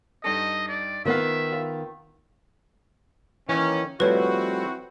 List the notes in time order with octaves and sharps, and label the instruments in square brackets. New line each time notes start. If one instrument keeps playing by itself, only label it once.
[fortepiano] G2 D#4 A4 [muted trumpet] D#5
[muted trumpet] D5
[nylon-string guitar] D#3 B3 [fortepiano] F4 B4 F5 [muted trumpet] E5
[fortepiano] F4
[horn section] D#3 A#3 C#4 [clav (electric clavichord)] E3
[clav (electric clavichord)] F3 G3 A3 [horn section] C4 E4 F#4 [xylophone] B4 C#5